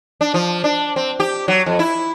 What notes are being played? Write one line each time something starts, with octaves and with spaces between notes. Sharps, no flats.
D4
F3
D4
C4
G4
F#3
F2
E4